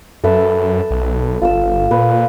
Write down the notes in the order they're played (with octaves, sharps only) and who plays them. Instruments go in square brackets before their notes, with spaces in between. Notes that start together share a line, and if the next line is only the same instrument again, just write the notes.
[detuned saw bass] F#2 [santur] A4 B4 E5
[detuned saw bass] B1
[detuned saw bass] G1 [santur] F4 E6
[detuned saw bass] A#2 [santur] B4